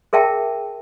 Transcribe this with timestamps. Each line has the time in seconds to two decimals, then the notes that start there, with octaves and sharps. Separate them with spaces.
0.13 G#4 A#4 E5 G5 A5